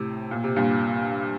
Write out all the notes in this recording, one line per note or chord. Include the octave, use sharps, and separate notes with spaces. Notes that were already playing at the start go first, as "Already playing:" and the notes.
Already playing: A2 C3
A#2
C3
G2 A#2